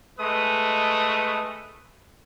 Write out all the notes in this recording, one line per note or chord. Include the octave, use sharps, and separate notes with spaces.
G#3 A3 B4 D#6